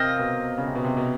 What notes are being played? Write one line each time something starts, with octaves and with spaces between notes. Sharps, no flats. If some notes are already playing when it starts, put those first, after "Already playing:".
Already playing: C3 C4 F4 A#4 D#5
B2
C#3
C3
B2
C3
B2